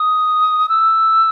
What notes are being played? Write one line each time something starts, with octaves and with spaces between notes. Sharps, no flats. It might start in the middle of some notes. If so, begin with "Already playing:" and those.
Already playing: D#6
E6